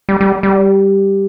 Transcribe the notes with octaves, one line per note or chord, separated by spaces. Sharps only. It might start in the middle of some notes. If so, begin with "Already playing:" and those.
G3
G3
G3